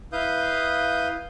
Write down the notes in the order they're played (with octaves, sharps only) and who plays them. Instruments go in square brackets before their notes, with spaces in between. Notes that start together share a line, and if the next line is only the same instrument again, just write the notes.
[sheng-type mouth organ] E4 B4 F5 D#6 G6